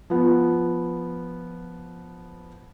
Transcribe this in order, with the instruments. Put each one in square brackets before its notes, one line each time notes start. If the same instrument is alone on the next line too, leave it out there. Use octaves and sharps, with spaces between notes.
[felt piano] F3 B3